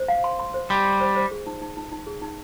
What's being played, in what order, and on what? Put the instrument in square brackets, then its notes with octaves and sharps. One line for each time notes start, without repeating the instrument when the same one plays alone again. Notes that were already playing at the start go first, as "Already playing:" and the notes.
Already playing: [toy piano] C5
F5
C6
C6
C5
[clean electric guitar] G3 [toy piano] C6
[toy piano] C6
C5
C5
G#4
D#4
D#4
D#4
D#4
G#4
D#4